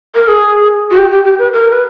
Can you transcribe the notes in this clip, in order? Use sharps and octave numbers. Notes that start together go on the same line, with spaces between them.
A#4
G#4
F#4
G4
G4
G4
B4
A#4
B4